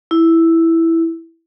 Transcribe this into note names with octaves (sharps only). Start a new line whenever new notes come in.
E4